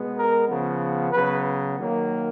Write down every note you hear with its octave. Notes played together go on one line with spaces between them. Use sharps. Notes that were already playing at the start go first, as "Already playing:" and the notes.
Already playing: B2 G#3 B3
A#4
C#3 F3 B3
C#3 F#3 B3 B4
D#3 F#3 A#3